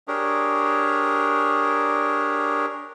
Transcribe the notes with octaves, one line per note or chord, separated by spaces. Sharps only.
D4 G4 G#4 A#4 C#5